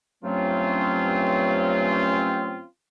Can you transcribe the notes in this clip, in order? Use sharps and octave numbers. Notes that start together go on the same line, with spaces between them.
G2 F#3 A3 C4 C#4 F4